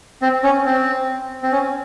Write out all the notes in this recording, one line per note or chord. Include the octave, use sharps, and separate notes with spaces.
C4
C#4
C4
C4
C#4